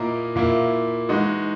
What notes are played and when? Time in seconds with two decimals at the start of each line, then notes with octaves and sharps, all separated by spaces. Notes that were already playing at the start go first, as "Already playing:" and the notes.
Already playing: A#2 A#3 E4 A#4 D#5
0.36 A#2 A#3 E4
1.09 E3 G#3 D#4 F#4